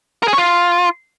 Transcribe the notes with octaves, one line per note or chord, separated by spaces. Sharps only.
A#4
G#4
C#5
F4